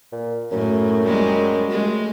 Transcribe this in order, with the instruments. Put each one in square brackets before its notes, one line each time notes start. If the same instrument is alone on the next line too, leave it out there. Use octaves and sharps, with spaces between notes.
[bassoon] A#2
[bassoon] F#2 [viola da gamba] A2
[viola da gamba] G3 G#3
G#3 A3